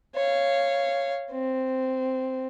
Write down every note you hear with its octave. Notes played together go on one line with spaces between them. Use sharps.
C#5 F5
C4